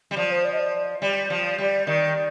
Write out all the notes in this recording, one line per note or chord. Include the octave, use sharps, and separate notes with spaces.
G3
F3 D5
C5
D5
D#5
D5
G3 D5
F3
G3 D5
D#3 D5